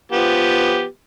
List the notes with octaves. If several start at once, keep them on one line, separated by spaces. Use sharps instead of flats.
F3 B3 G4